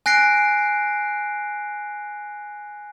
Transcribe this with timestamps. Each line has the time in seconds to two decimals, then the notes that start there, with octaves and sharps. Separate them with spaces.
0.06 G#5 F#6 A#6 C7 D7